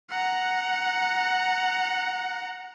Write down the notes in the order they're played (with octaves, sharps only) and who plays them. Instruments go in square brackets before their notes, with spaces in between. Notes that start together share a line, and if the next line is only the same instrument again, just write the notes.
[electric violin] F#5 A#5